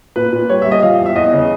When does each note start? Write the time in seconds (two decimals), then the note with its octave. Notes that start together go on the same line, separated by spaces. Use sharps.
0.16 A#2 B4
0.32 A#2
0.49 G3 C#5
0.62 G3 E5
0.72 D#5
0.83 F3 F5
1.00 E2
1.06 E5
1.16 E2 D#5
1.33 C#3